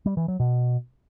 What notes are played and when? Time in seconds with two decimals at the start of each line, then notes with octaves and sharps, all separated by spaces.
0.06 G3
0.17 E3
0.28 F#3
0.40 B2